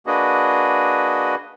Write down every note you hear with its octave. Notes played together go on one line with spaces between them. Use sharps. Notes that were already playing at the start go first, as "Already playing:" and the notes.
A#3 D4 F#4 G#4 B4 D#5